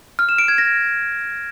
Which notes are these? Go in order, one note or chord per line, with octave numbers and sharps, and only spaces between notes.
F6
E7
D7
G#6
A#6